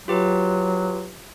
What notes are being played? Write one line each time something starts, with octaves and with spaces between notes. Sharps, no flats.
F#3 F4 G4 B4